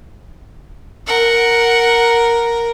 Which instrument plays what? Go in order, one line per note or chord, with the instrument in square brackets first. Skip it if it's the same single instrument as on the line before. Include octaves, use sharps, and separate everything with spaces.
[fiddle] A#4 [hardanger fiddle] F#5